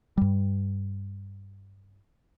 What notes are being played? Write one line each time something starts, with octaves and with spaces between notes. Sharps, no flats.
G2 G3